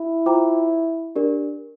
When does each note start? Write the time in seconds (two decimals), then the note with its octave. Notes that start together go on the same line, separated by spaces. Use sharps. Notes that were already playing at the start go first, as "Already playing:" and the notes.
Already playing: E4
0.26 F4 C5 G5 A#5 D6
1.15 D4 G4 A#4 D5